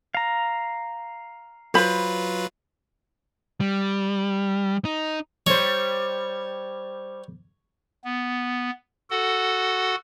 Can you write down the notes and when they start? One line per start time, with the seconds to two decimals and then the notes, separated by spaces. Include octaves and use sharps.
0.15 F5 A#5
1.74 F#3 F4 B4 C5 B5
3.60 G3
4.85 D#4
5.47 G3 C5 C#5
8.04 B3
9.10 F#4 A4 F#5